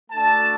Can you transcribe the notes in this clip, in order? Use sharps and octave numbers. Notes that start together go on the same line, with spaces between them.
A3 D4 F#4 A5